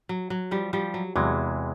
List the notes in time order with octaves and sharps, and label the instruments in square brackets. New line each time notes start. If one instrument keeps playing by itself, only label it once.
[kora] F#3
F#3
F3 G3
F3 G3
F#3
[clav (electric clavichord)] E2 C3 E3 G#3 [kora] F#3